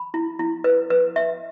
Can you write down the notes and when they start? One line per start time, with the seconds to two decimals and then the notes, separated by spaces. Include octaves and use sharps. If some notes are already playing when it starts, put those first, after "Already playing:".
Already playing: B5
0.14 E4
0.39 E4
0.64 B4
0.90 B4
1.16 E5